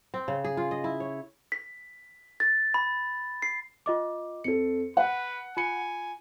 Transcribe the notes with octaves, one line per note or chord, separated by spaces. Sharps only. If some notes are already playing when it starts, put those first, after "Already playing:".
C4
C#3
G#4
F4
D#5
E4
C#5
B6
A6
B5
C7
F4 D#5 D6
F2 A4 C#7
B4 F#5
F4 G#5 B5 C#7